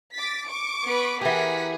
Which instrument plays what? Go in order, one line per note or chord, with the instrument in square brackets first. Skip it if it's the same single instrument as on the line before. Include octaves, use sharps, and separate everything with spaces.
[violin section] D6 A6 B6
C#6 D6 D7
[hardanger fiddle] B3 B4
[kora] E3 G4 [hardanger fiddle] G#4 [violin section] A#4 F#5 B6